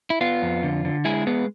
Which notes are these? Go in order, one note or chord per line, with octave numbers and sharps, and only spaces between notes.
E4
B3 F4
F2
D3
D3
G#3 E4 G#4
B3 G#4 B4